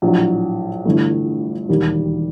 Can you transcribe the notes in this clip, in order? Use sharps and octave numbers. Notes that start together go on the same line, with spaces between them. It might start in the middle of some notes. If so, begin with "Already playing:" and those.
A#1 A2 F#3
G1 G2 E3 A3
E1 D#2 D#3 G3